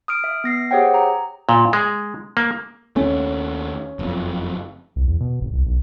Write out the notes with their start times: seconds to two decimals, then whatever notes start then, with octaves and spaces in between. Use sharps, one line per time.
0.08 D#6 F6 D7
0.24 E5
0.44 B3 A#6 C7
0.71 G4 G#4 C5 C#5 F#5 G5
0.94 A#5
1.49 A#2
1.73 G#3
2.37 A#3
2.96 D#2 A3 C#4
3.99 F#1 F2
4.96 C2
5.08 E2
5.20 B2
5.41 G#1
5.53 C2
5.66 B1